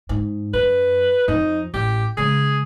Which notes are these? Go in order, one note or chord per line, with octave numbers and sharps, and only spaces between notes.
G#2
F#2 B4
F2 F3 D#4
A1 G4
C#3 G#3 G#4